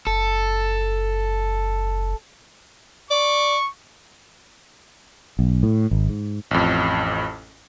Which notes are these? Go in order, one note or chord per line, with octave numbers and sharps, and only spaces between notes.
F#1 A4
D5 C#6
B1
A2
G#1
G#2
A1 F2